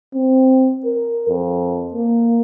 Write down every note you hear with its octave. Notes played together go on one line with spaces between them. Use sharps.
C4
A#4
F2
A#3